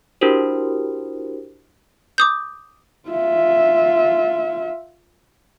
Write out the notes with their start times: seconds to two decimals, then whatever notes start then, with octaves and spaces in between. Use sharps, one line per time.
0.21 D4 E4 F#4 G4 A#4 C5
2.18 D6 D#6 G6
3.09 F4 E5